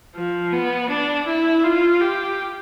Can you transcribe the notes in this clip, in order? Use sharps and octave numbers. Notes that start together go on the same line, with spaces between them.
F3
B3
D4
E4
F4
G4